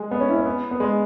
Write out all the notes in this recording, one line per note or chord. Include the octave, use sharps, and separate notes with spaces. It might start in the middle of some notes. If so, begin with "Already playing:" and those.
Already playing: G#3
B3
C#4
E4
C#4
B3
B3
G#3